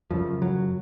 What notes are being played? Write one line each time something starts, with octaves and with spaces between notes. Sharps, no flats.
F#2 C#3 F3
F#3